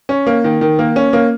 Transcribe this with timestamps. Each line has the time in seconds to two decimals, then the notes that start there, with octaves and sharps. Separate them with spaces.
0.09 C#4
0.26 A#3
0.44 D#3
0.61 D#3
0.79 A#3
0.96 C#4
1.13 A#3